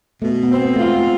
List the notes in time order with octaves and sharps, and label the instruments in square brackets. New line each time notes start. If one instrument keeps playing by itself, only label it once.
[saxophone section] B2 [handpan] A3
[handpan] B3
[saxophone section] C4
[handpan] B3
[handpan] A3 [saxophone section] F4
[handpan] G#3